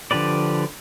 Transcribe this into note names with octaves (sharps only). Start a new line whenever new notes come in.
D3 F3 G4 B4 D5